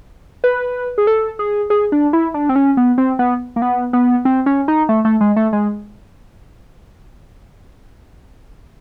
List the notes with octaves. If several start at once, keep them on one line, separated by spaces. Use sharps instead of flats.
B4
G#4
A4
G#4
G#4
D4
E4
D4
C4
C#4
B3
C4
B3
A#3
B3
B3
C4
C#4
D#4
A3
A3
G#3
A3
G#3